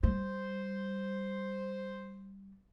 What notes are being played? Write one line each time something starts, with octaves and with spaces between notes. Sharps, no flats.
G3 C5